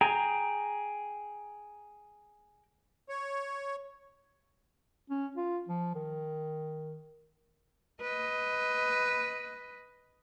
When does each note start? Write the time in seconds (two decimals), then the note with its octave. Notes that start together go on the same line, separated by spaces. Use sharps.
0.01 G#4 G5 A#5
3.09 C#5
5.10 C#4
5.37 F4
5.68 F3
5.95 D#3
8.01 B4 D#5